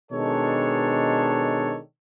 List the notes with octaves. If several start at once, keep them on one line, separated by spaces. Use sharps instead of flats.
B2 D#3 G#3 D4 A4 C#5